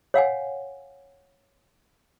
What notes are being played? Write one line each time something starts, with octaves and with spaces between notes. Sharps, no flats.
C#5 F5 F#5 G#5